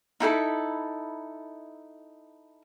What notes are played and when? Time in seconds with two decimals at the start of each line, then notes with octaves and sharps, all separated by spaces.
0.20 D#4 E4 A4 B5